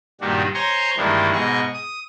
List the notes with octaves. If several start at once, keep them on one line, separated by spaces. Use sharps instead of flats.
G2 A#2 D#3 G3 D4 F#4
C5 C#5 G#5 A#5 C6 C#6
G2 D#3 E3 G#3 A#3 D4
G#2 B2 G#4 D#5 C#6
D#6